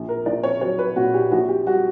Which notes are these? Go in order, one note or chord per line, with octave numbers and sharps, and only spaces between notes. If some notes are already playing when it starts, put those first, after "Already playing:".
Already playing: A#1
A#4
A#1 D5
C#5
F#3 C#5
B4
A#2 F#4
G4
A#1 F#4
G4
G3 F#4